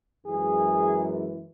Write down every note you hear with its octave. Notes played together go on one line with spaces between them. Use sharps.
F#2 E3 G#3 G#4